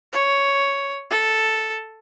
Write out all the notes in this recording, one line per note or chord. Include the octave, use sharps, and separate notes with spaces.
C#5
A4